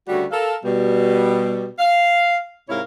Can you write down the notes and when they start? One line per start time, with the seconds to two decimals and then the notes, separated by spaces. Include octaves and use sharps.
0.08 D2 C#3 G3 A3 F#4
0.31 A4 A#4 F5
0.64 B2 G3
1.79 F5
2.69 G#2 C3 E4 A#4 C#5 F5